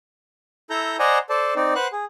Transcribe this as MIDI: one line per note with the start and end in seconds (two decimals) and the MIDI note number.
0.70 0.97 64
0.70 0.97 69
0.70 0.97 82
0.70 0.97 91
0.99 1.18 72
0.99 1.18 74
0.99 1.18 75
0.99 1.18 78
0.99 1.18 80
0.99 1.18 82
1.29 1.54 69
1.29 1.54 72
1.29 1.54 74
1.29 1.54 81
1.56 1.74 60
1.56 1.74 63
1.56 1.74 74
1.75 1.88 71
1.75 1.88 72
1.75 1.88 78
1.75 1.88 90
1.92 2.05 68